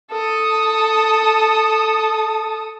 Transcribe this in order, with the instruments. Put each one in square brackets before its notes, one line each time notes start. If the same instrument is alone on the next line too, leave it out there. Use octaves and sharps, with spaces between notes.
[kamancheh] A4 D#6